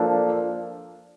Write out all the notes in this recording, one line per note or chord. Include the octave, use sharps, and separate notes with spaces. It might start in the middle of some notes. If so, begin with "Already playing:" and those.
Already playing: F3 A#3 D4 A4